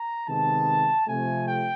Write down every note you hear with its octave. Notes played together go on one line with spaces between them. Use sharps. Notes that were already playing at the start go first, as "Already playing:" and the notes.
Already playing: A#5
C3 D#3 G#3 B3 A5
C3 F3 A3 G#5
G5